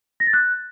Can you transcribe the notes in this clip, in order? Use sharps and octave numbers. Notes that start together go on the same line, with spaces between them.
A#6
A6
F#6